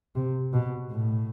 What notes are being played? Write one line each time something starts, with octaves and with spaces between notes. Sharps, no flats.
C3
B2
A2